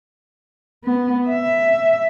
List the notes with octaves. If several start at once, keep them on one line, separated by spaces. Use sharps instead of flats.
B3
E5